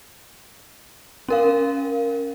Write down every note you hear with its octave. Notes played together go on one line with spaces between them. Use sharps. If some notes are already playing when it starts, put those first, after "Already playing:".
C#4 A#4 F5